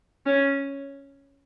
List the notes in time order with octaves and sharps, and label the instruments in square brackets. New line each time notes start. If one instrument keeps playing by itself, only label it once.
[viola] C#4